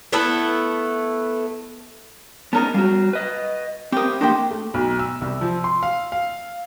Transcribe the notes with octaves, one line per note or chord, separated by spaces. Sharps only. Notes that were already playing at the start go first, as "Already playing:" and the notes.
A3 B3 E4 A4
B3 C#4 D#4 G#4 A#4 A5
G3 F#4 F5
B4 D#5
C4 G4 A#4 D#6
A3 A#3 D4 G4 C5 D#5
A3
B1
E6
C2
F3
C6
F5
F5